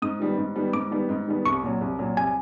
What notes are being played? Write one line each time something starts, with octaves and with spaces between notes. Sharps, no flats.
G#2 D#6
D#3 G3 B3
G#2
D#3 G3 B3
G#2 D6
D#3 G3 B3
G#2
D#3 G3 B3
C2 C#6
A#2 F#3
C2
A#2 F#3
C2 G#5